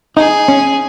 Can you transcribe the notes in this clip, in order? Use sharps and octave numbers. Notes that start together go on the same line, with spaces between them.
D#4 G#4
C#4